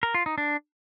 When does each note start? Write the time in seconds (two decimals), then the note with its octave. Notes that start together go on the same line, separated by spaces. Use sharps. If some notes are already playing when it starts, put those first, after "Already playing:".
0.03 A#4
0.14 F4
0.26 D#4
0.38 D4